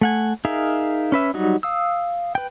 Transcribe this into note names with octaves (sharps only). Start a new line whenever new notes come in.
A3 F#5 G#5
D#4 G#4 A#4 E5 F5
C#4 B4 E5
F#3 G3 D#4 F#4
F5 D#6 E6
B4 G5